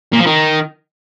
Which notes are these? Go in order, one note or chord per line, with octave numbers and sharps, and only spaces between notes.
A#2
F3
D#3